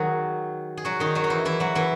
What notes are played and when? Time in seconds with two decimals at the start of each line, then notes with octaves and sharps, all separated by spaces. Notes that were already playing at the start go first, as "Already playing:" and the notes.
Already playing: D#3 F#3 D#4 F#4 G#4
0.77 G#4
0.85 F#3 F#4
1.00 D#3 D#4
1.15 F#3 F#4
1.24 D#4
1.30 E3 E4
1.45 E3 E4
1.60 F#3 F#4
1.75 E3 E4